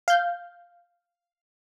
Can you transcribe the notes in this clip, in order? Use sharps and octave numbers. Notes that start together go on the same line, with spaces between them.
F5 G6